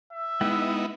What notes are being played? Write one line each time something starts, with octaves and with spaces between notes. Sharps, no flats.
E5
G#3 B3 D#4 E4 F#5 G5